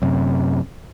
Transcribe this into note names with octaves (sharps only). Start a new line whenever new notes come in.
F#2 C3